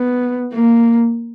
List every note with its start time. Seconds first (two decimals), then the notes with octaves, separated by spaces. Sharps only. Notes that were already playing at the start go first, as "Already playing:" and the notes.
Already playing: B3
0.53 A#3